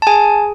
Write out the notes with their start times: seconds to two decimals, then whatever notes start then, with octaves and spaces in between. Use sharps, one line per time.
0.02 A5
0.07 G#4 G#5